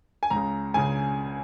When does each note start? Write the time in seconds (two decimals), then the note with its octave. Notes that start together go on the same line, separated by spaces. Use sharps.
0.23 G#5
0.30 C#2 C#3 A#5
0.74 C#2 C#3 G#5